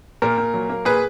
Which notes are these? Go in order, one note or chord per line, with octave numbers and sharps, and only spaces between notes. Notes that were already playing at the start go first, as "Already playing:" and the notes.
A#2 A#4
A#2
F#3
A#3
A#2 G#4 B4